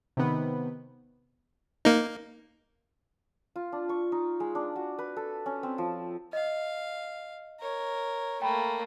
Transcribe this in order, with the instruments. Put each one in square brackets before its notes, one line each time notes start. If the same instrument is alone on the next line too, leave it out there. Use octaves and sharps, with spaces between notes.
[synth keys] C3 D#3 B3
[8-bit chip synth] A#3 D#4
[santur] F4
D4
C#6
D#4
G#3
D4
F#4
B4
A4
C#4
C4
F3
[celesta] D#5 [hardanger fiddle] F5
[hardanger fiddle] A#4 C#5
[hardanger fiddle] A3 A#3 [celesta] G5 B5